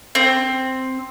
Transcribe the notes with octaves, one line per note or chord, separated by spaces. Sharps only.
C4